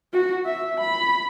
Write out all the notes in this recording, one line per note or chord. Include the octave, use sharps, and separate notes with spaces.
F#4
E5
B5